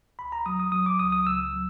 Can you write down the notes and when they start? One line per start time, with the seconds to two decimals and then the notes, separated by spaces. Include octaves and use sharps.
0.19 C#2 B5
0.32 A#5
0.46 F#3 D#6
0.60 D#6
0.72 F#3 D#6
0.86 D6
0.99 C#2 D#6
1.12 D#6
1.26 C#2 E6
1.53 F#3